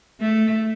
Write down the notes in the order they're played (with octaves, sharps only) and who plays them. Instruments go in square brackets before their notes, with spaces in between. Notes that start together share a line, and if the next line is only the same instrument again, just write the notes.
[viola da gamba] A3